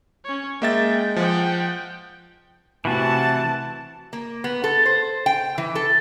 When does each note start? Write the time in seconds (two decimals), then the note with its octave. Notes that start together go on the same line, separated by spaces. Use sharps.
0.25 C#4 C#5
0.62 G#3 A#3 E5 G5 A6
1.16 F3 F#5 G5
2.85 C3 E3 A3 F#4 A5
4.13 A#3
4.44 B3
4.64 A4
4.86 C5
5.26 G5
5.58 E3
5.75 A4